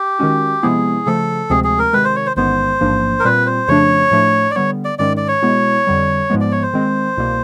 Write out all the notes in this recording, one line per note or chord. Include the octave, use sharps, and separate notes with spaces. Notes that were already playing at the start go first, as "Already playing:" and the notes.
Already playing: G4
D#3 G#3 C#4 F#4
C3 F3 G#3 B3 E4 G#4
C#3 F3 A3 A4
D2 C3 F3 G#3 C4 G#4
G#4
A#4
C3 D#3 G#3 B4
C5
C#5
C5
A1 G#2 D#3 G#3 B3 C5
A1 G#2 F3 A#3 D4
A#4
A#2 G3 C4 F4 B4
C5
F2 C#3 F3 A3 D4 C#5
A2 F3 A3 D4
D5
D3 G3 B3 C#5
D5
G#2 D#3 G#3 C#4 D5
D5
C#5
B2 G#3 B3 E4
F2 D3 G3
G#2 F3 G#3 B3
D5
C#5
C5
D#3 G#3 C4
C2 B2 G3 A#3